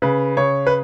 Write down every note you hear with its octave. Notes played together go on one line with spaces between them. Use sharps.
C#3 B4
C#3 C#5
B4